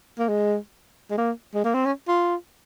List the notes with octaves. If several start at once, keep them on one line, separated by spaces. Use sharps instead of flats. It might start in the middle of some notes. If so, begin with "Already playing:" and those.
A#3
G#3
G#3
A#3
G#3
A#3
C4
C#4
F4